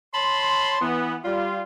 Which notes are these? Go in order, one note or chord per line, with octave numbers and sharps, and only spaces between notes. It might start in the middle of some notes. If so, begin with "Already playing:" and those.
C#5 A5 B5 C6
E3 B3
G3 F4